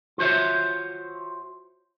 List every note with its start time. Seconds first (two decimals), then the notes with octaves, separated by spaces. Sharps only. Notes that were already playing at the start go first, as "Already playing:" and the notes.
0.18 F4 F#4 C5 C#5 E5